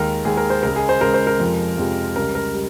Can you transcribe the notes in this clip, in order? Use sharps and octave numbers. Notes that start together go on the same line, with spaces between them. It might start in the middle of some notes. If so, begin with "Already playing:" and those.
Already playing: D#2 D#3 G#3 A#4
D#2 D#3 G#3 G#4
A#4
C5
C#2 C#3 G#3 A#4
G#4
C5
C#2 C#3 G#3 A#4
C5
A#4
F2 C3 F3 G#3
F2 C3 F3 G#3
C#2 C#3 G3 A#4
A#4
G3